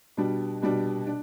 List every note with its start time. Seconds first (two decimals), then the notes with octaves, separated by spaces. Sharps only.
0.17 B2 G3 D4
0.62 B2 G3 D4
1.07 D4